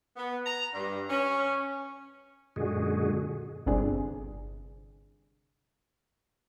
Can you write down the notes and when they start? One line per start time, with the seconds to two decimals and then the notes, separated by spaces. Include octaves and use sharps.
0.17 B3
0.46 A#5
0.74 G2
1.10 C#4
2.56 F#2 A#2 D3 G#3 F#4 G#4
3.66 G1 C3 D4 G#4